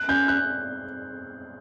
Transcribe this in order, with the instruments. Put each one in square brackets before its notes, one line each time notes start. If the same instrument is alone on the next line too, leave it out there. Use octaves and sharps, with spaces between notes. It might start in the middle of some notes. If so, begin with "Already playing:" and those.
Already playing: [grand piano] F#6
[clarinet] C#4 [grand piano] G6
[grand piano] F#6